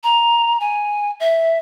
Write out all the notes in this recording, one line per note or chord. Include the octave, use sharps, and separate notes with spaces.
A#5
G#5
E5